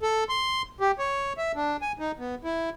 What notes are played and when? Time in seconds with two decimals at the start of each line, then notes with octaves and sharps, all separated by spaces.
0.02 A4
0.29 C6
0.80 G4
0.99 C#5
1.38 E5
1.56 D4
1.82 G#5
1.99 D#4
2.19 B3
2.44 E4